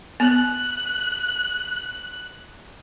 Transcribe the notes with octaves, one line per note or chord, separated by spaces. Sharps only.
B3 F#6